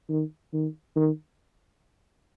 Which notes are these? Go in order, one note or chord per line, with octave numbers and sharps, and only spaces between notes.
D#3
D#3
D#3